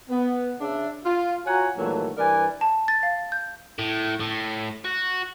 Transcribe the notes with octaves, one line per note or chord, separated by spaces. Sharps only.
B3
C#3 D4 E5
F4
F4 F#4 C#5 F#5 G#5 A#5
G2 A#2 D#3 E3 F#3 A3
G2 E3 A#4 B4 D5 G#5
A5
A6
F5
G6
A2
A2
F#4